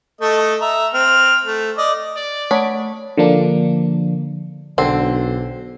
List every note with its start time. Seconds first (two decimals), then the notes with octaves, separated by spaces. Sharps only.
0.21 A3 A4 D#5
0.61 E5 A#5
0.94 C4 F6
1.44 A3
1.78 D5 D#5
2.16 D5
2.51 A3 C#5 F#5 A5
3.17 D3 F3 A#3 D4
4.78 B1 D3 C4